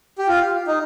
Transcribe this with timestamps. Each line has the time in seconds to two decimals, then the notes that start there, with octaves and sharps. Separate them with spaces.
0.18 G4
0.28 F4
0.67 D#4